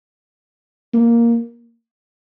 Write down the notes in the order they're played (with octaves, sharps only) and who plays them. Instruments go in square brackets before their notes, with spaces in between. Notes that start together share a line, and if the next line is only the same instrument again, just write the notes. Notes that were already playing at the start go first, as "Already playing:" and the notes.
[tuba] A#3